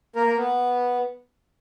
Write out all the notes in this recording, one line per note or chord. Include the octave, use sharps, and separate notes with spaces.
A#3 A#4
A#3
B3